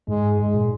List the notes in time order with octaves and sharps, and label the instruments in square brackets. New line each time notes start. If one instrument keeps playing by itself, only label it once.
[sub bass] G#2 [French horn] G#3
[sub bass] G#2 [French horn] G#3
[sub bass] A#2